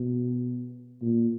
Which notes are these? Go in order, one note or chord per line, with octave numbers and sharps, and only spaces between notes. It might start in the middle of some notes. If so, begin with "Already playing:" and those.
Already playing: B2
A#2